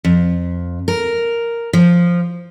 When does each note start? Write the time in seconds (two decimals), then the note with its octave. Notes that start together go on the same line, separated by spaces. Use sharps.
0.05 F2
0.88 A#4
1.73 F3